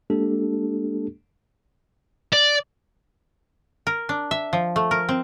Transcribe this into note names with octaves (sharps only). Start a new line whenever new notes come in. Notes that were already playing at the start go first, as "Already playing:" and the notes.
G#3 A#3 D4 G4 A4
D5
A#4
D4
E5
F3
A3
A#4
C4